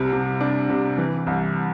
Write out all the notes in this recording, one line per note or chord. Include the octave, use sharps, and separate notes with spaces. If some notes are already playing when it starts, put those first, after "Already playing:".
Already playing: C2 C3 G3
C3
D4
C3
E3
C2